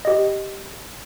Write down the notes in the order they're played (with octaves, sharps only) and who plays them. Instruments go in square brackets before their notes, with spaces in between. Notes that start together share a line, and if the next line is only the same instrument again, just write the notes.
[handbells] G4 D#5